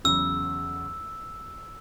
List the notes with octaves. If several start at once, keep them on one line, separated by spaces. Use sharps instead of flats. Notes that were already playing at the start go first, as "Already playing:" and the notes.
E2 C#3 F#3 E6